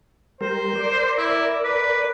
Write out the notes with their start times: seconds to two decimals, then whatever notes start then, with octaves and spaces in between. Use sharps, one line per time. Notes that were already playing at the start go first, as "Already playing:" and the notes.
0.41 G3 A#4 C5
0.75 A#4 D5
1.17 E4
1.64 B4